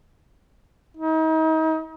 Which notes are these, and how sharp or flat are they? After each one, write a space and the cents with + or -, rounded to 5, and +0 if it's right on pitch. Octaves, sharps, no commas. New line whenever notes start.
D#4 +35